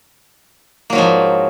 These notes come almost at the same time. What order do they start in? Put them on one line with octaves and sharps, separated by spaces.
A#3 F#3 G#2 F3